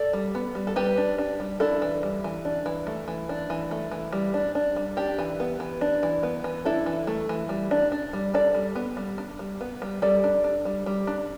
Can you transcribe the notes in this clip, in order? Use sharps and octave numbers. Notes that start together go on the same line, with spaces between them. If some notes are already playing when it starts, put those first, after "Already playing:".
Already playing: A4 D5
G3
B3
G3
A4
G3 G4 B4
D4
D4
G3
D4 E4 A4
E3
G3
E3
D4
E3
A3
E3
D4
E3
A3
E3
G3
D4
D4
G3
D4 G4
E3
B3
E3
D4
E3
B3
E3
D4 E4 A4
E3
A3
E3
G3
D4
D4
G3
D4 A4 D5
G3
B3
G3
D4
G3
B3
G3
G3 A4 D5
D4
D4
G3
G3
D4